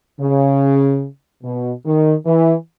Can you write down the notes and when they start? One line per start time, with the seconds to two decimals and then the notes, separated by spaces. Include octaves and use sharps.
0.21 C#3
1.43 B2
1.85 D#3
2.26 E3